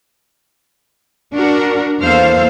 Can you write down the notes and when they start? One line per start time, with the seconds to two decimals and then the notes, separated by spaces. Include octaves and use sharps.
1.34 D4 F#4 A#4
1.99 E2 A#3 A4 C5 F5